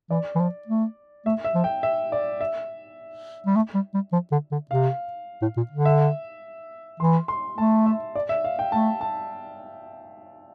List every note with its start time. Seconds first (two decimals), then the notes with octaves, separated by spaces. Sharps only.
0.10 E3 D5
0.35 E3
0.39 F3
0.67 A3
1.26 A3 E5
1.44 E5
1.54 F3
1.64 G5
1.83 E5
2.12 D5
2.41 E5
3.46 G3
3.56 A3
3.74 G3
3.94 G3
4.12 F3
4.32 D3
4.52 D3
4.71 C3 F5
5.42 A2
5.57 A#2
5.71 D3
5.85 E5
7.00 E3 C6
7.28 C6
7.58 A3 A5
7.86 E5
8.15 D5
8.29 E5
8.44 F5
8.59 G5
8.72 A3 A5
9.01 A5